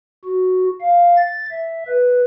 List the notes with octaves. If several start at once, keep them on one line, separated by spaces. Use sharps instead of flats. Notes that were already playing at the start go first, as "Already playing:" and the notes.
F#4
F5
A6
E5
B4